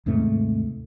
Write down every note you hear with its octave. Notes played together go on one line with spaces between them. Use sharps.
D#2 G#2 C3 A3